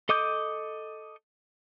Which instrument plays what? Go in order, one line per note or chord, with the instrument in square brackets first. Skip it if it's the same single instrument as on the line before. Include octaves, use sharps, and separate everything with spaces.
[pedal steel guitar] A4 D#5 D6 D#6 G6